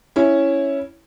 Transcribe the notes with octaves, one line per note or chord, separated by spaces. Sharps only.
C#4 E4